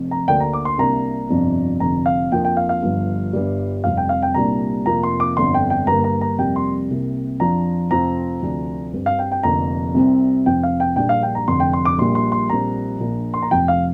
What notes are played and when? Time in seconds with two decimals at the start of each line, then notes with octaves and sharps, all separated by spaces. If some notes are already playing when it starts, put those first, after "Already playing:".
Already playing: F1 F2 F3
0.11 A#5
0.28 D2 D3 A#3 D4 G5
0.40 A#5
0.53 D6
0.65 C6
0.78 C2 C3 A#3 D4 A#5
1.29 G1 F2 C3 F3 D4
1.80 F1 F2 D3 A#5
2.06 F5
2.32 F2 F3 A#3 D4 G5
2.45 G5
2.57 F5
2.69 F5
2.83 G1 G2 F3
3.33 G1 G2 G3
3.84 F1 F2 C3 G3 F5
3.97 G5
4.09 F5
4.23 G5
4.34 C2 A#2 G3 D4 A#5
4.85 F1 F2 C3 F3 A#3 A#5
5.03 C6
5.20 D6
5.37 G1 F2 D3 C6
5.54 G5
5.70 G5
5.87 G2 D3 A#3 A#5
6.04 A#5
6.21 A#5
6.38 F2 C3 G3 A#3 G5
6.56 C6
6.90 C2 C3 A#3
7.40 F2 F3 D4 A#5
7.91 F1 F2 F3 C4 A#5
8.42 D2 C3 F3 D4
8.93 G2 G3 C4
9.06 F5
9.19 G5
9.32 G5
9.43 F1 F2 D3 A#3 A#5
9.94 C2 C3 G3 C4
10.46 F1 F2 F3 C4 G5
10.63 F5
10.80 G5
10.96 A#1 A#2 G3 D4 G5
11.09 F5
11.23 G5
11.35 A#5
11.48 F1 F2 D3 C6
11.60 G5
11.73 C6
11.85 D6
11.98 A#1 A#2 G3 C6
12.15 C6
12.32 C6
12.50 A#1 A#2 G3 C4 A#5
13.00 A#1 A#2 F3 D4
13.34 C6
13.42 A#5
13.51 F1 F2 F3 G5
13.68 F5